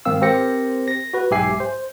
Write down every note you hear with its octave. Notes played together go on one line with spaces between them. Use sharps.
G#2 D#3 C4 F5 E6
C4 G4 A#4 C5 A#6 C#7
A#6
F#4 B4
B1 G#2 G4 E5 G#5 C7
C5